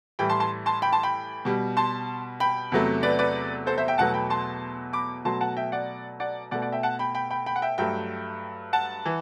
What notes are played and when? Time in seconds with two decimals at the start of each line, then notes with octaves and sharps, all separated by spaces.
0.19 A2 E3 G3 G5 B5
0.29 A5 C6
0.40 A5 C6
0.66 A5 C6
0.82 G5 B5
0.93 A5 C6
1.03 G5 B5
1.45 B2 G3
1.77 A5 C6
2.40 G5 B5
2.72 E2 C3 F#3 A3
3.03 B4 D5
3.19 B4 D5
3.66 A4 C5
3.78 C5 E5
3.88 E5 G5
3.98 E2 B2 F#3 A3 F#5 A5
4.14 G5 B5
4.30 A5 C6
4.93 B5 D6
5.25 B2 F#3 A3 A5 C6
5.41 F#5 A5
5.57 E5 G5
5.72 D5 F#5
6.20 D5 F#5
6.51 B2 D5 F#5
6.55 A3
6.62 D5 F#5
6.72 E5 G5
6.83 F#5 A5
6.99 G5 B5
7.15 G5 B5
7.30 G5 B5
7.46 G5 B5
7.56 F#5
7.62 E5 G5
7.78 G2 F#3 A3 E5 G5
8.73 F#5 A5
9.05 E3